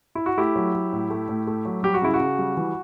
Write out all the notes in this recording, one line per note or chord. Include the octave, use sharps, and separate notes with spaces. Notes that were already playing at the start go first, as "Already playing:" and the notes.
E4
F#4
A3 E4 G4
F#3
F#3
A2
A3
A2
A3
F#3
G3 G4
F#4
C#3 E4
F#4
C#3
G3
E3